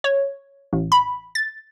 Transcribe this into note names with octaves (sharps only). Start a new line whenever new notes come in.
C#5
A1
B5
A6